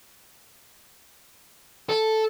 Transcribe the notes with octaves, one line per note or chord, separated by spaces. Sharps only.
A4